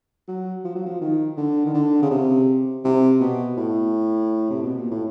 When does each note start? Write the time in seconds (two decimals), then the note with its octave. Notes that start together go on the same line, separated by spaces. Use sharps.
0.28 F#3
0.64 F3
0.75 F#3
0.86 F3
1.01 D#3
1.37 D3
1.66 D#3
1.74 D3
2.02 C#3
2.11 C3
2.84 C3
3.21 B2
3.57 A2
4.50 C3
4.63 B2
4.78 A#2
4.91 A2